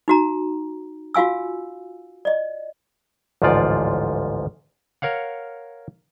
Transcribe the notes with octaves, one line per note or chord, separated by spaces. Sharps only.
D#4 F#4 A#5
F4 F#4 F5 G#5 E6
D5 D#5
A1 D2 G#2 F3 F4 D5
A#4 C#5 F5 F#5